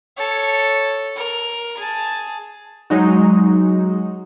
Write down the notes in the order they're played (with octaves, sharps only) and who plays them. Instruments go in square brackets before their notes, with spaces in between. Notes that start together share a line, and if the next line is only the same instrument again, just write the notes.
[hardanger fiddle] A4 C#5
A#4
G#4 A5
[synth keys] F#3 G#3 D#4 F#4